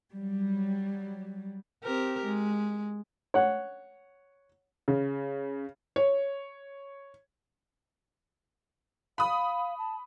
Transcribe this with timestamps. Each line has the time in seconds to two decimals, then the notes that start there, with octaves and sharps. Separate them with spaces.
0.14 F#3 G3
1.83 C4 G4 A#4
2.25 G#3
3.34 C#5 F#5
4.88 C#3
5.96 C#5
9.18 F5 B5 D#6
9.78 A5